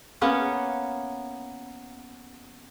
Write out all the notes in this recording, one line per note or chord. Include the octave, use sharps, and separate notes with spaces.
A#3 B3 C#4